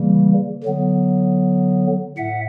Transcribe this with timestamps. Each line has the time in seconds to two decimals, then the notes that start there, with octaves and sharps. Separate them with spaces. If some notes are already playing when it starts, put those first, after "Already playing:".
Already playing: C#3 E3 G3 A#3
0.64 D3 F#3 B3
2.17 A2 E5 F#5